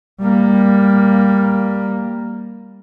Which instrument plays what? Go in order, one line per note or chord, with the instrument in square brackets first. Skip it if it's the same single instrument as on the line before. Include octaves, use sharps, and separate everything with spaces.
[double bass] G3 A#3